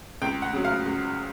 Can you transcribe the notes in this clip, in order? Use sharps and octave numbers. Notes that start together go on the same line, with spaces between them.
C#2 G5
F#5
C#3 F#3
F5
C#2